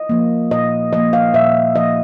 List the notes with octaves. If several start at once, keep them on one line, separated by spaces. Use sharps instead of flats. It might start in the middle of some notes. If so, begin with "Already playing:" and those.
Already playing: D#5
F3 A#3
A#2 D#5
F3 A#3 D#5
F5
A#2 E5
F3 A#3 D#5